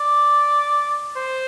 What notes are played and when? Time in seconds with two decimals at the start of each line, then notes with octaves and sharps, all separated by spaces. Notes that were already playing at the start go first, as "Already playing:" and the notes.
Already playing: D5
1.16 C5